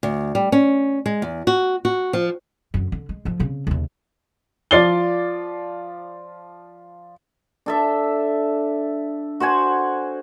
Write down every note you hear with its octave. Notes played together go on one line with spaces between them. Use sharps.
D2
G3
C#4
G#3
E2
F#4
F#4
F3
F#2 D3
D3
G#3
D3 F3
C#3 C4
D#2 C#3
F3 F4 D5 A6 C7 G7
D4 A4 E5
F#4 C5 F#5 G#5